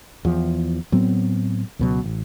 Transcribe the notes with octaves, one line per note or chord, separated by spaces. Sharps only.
E2 F3
A2 F#3 B3 C4
C#2 B2 F#3
A1